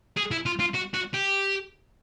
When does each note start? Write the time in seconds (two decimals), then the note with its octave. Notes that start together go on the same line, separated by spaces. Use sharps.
0.17 G#4
0.31 E4
0.46 F4
0.60 F4
0.75 F#4
0.94 F#4
1.14 G4